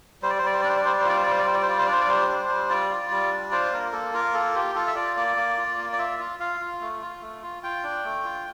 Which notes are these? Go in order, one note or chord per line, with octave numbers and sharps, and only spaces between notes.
G3 C5
D5
C5
G3 D5
C5
D5
D4
C5
D5
G3 C5
D5
C5
F4 D5
C5
G3 D5
C5
D5
G3 C5
D5
C5
F4 D5
C5
D4 D5
C5
D5
G3 C5
D4
G3
F4 D5
F4
G3
D4
F4 C5
A#3 A#4
A#3 A4
F4 A#4
A#3 A4
F4 G4
F4 A4
E5
F4 D5
A#3 D5
A#3
F4
A#3
D5
F4 E5
F4
F4 F5
F4
A3
F4
A3
F4
F4 G5
D4
A3
F4